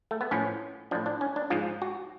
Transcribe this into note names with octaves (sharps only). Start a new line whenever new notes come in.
A3
B3
A2 F3 C#4
A2 F3 D4
D4
C#4
D4
G#2 F3 F4
F#4